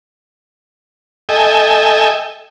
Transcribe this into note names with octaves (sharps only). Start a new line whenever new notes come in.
A4 D#5 E5 G5 G#5